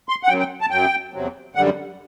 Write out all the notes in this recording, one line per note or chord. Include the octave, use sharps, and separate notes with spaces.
C6
F#5
F#2 F#3 G5
G5
A5
F#2 F#3 G5
E2 C3 F#3
F#2 D3 G3 F#5